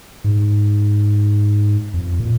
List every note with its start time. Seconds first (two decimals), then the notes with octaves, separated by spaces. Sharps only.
0.24 G#2
1.94 F2
2.20 A#2